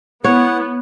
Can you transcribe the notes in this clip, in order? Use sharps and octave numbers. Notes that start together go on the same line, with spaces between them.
B3 E4 C#5 F#5